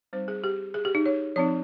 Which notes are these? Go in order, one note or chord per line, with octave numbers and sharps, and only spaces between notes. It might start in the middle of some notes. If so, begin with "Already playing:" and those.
G3 C4 D#4 C5
G#4
G4
G#4
G4
D#4
C#5
F3 C4 D#4 C#5